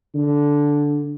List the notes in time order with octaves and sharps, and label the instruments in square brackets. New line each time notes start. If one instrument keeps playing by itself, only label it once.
[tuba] D3